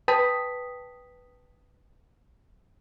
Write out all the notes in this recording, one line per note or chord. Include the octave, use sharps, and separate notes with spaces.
B4 G5 A5 D#6 B6